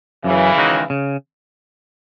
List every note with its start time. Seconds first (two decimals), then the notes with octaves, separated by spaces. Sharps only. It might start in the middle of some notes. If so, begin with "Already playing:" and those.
0.24 F#2 C#3 E3
0.57 D#3 G#3 D#4 F#4
0.90 C#3